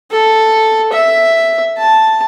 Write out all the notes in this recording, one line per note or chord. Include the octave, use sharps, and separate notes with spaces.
A4
E5
A5